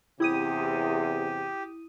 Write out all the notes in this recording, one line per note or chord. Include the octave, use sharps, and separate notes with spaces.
E2 C3 E4 G4 D#6 D#7